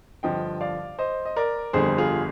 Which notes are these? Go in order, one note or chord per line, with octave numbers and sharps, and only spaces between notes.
G2 D3 F3 D#5 G5
D5 F5
C5 D#5
D#5
A#4 D5
G1 F2 D3 G3 G#4 C5
F4 G#4